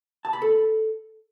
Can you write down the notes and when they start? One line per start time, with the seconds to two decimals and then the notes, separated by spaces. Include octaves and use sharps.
0.25 A5
0.33 B5
0.42 A4